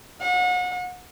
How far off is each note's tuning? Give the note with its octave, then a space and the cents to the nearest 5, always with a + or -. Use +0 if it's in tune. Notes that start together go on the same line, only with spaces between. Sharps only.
F#5 -35